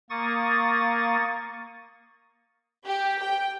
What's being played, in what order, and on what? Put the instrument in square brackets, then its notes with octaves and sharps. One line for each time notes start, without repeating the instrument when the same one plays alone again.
[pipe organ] A#3 C#6 D#6 A6
[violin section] G4
G5